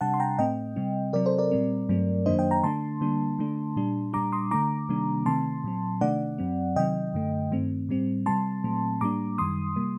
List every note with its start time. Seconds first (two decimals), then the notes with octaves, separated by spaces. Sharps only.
0.01 C3 G3 D4 F#5 A5
0.14 C6
0.20 G5 A#5
0.38 A2 A3 C4 D#5 G5
0.76 C3 G3 C4
1.13 C3 F#3 C4 A#4 D5
1.26 A4 C5
1.38 A#4 D5
1.52 A#2 G3 C4
1.89 G2 F#3 A3 C4
2.26 F#2 D#3 F#3 A#3 D4 C5 D#5
2.39 D#5 G5
2.51 G5 A#5
2.63 D3 A3 D4 A5 C6
3.01 D3 G3 A#3 D4
3.39 D3 A3 D4
3.76 A#2 G3 D4
4.13 A#2 G3 D4 A#5 D6
4.32 C6 D#6
4.51 D3 A3 D4 A#5 D6
4.89 C3 D#3 G3 A#3 D4
5.26 C3 D#3 A3 C4 A5 C6
5.64 A#2 F#3 C4
6.01 C3 D#3 A3 D4 D5 F#5
6.38 F#2 F#3 C4
6.76 C3 D#3 F#3 C4 D#5 G5
7.14 F#2 D3 A3
7.51 G2 D#3 A3 C4
7.89 A2 G3 C4
8.26 C3 G3 C4 A5 C6
8.64 A#2 F#3 A3 C4
9.01 A2 G3 A#3 D4 A#5 D6
9.38 F#2 D#3 G3 C6 D#6
9.76 C3 G3 A#3